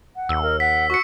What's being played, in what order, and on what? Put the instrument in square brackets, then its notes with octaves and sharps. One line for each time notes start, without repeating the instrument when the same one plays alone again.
[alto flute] F#5
[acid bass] D#2 [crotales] E6
[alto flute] A#4
[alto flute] F#5 [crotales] B6
[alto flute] F#4 [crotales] C#6 C#7